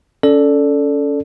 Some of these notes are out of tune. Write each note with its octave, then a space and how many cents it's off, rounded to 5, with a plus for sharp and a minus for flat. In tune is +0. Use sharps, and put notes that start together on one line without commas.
C#4 +20 A4 +0 D5 +0